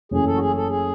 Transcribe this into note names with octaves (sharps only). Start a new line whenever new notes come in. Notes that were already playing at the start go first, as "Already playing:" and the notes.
F#1 F#2 E3 A3 G#4
A4
F#4
G#4
A4
G#4